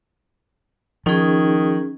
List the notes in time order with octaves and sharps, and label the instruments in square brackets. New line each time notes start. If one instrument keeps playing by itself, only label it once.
[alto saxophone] D#3 [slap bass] F3 [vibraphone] C#4 D#4 G#4